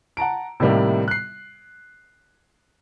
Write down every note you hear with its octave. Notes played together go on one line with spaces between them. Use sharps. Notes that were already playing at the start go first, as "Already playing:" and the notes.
F#5 A5 A#5 D7
A2 C3 D#3 G3 A#3
F#6 C7